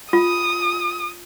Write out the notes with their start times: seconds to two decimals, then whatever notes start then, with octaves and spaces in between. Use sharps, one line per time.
0.13 F4 D#6